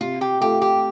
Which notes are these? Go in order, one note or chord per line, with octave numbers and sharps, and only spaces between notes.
C3 F4
G4
A3 F4 G4 A4
G4